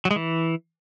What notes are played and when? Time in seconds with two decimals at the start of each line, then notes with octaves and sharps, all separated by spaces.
0.05 F#3
0.11 G#3
0.16 E3